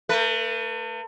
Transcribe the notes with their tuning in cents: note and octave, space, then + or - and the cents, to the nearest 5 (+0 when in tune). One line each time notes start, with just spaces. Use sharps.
A3 +40 B4 -10